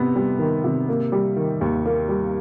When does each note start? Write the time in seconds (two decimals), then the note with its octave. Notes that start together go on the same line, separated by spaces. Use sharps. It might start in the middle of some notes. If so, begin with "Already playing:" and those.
Already playing: C3 B3
0.16 G3
0.39 D#3
0.64 C3
0.89 A#3
1.12 G3
1.36 D#3
1.61 D#2
1.86 A#3
2.09 G3